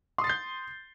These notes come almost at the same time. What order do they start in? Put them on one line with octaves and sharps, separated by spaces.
C6 D#6 A6 C7 G6